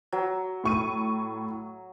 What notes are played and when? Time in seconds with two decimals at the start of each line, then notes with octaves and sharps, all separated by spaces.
0.12 F#3
0.64 A2 C#6 D#7